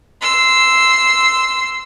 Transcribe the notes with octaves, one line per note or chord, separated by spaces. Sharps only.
C6 E6